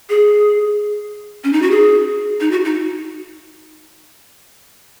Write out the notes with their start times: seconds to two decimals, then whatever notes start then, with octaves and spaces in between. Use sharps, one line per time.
0.10 G#4
1.44 C#4
1.53 D#4
1.62 F#4
1.71 G#4
2.41 D#4
2.51 F#4
2.65 D#4